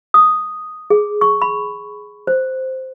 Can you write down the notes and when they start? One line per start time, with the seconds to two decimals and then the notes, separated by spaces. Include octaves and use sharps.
0.14 D#6
0.90 G#4
1.21 C#6
1.41 B5
2.27 C5